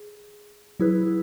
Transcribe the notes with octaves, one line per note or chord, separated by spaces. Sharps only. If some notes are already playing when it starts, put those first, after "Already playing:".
Already playing: G#4
F#3 E4 G#4 B4